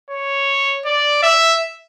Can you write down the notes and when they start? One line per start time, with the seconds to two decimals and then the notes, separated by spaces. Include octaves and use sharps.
0.10 C#5
0.86 D5
1.23 E5